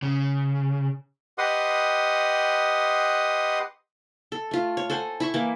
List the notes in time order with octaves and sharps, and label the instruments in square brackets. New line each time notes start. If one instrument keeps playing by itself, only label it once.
[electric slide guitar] C#3
[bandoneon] G4 B4 D#5 F#5 C6 D#6
[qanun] A4
A3 F4
C#5
A4 C5 F#5 G#5
E4 E5 C#6
E3 A#3